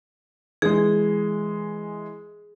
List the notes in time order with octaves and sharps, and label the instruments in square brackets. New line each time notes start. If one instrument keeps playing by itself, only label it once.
[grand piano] E3 G#3 [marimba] G#4